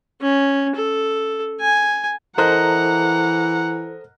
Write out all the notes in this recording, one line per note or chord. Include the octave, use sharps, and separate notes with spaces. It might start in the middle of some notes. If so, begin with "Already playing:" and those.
C#4
A4
G#5
E3 A4 A#4 C5 D#5 F#5 A#5 F#6